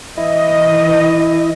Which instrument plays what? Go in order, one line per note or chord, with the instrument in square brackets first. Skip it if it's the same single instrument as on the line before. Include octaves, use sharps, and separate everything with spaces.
[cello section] E3 D#5 [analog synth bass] E4